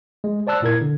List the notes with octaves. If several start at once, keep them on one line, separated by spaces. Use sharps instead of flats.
G#3
C5 D5 A5 E6 F#6
A#2 E4 A#4 G#6
D3